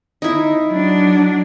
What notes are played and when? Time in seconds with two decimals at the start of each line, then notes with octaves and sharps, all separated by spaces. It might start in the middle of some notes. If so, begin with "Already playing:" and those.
0.22 D#4 E4
0.69 F#3 D4